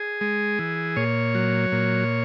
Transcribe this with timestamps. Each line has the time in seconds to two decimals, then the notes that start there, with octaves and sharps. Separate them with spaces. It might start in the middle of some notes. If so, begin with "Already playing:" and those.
Already playing: G#4
0.21 G#3
0.59 E3
0.96 A#2 C#5
1.35 F#3
1.72 A#2